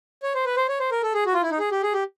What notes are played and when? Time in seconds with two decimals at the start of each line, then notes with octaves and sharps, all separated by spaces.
0.23 C#5
0.35 C5
0.45 B4
0.57 C5
0.68 C#5
0.80 C5
0.92 A#4
1.03 A4
1.14 G#4
1.26 F#4
1.34 F4
1.42 E4
1.51 D#4
1.59 G#4
1.72 G4
1.83 G#4
1.93 G4